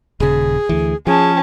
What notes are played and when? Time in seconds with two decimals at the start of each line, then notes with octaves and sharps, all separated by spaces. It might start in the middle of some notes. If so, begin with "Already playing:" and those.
0.20 D#1 C#3 G#4
0.69 D2 E3
1.07 F3 C#4 G#4 A5